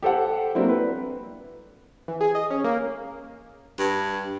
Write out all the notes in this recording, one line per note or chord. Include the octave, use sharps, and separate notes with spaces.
G4 A4 C5 F#5
F#3 A#3 C4 D4 E4
B4
E3
G#4
D#5
C#4
A#3
G2